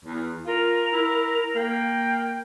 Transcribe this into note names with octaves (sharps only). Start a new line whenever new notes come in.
E2
F4 A#4
E4
A#3 G5